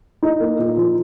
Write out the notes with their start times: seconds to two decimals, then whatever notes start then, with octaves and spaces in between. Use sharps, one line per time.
0.23 D#4
0.40 A#3
0.59 A#2
0.77 F3